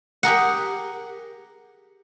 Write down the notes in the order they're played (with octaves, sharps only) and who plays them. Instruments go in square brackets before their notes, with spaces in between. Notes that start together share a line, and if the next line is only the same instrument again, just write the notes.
[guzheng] G4 G#4 A#4 F#5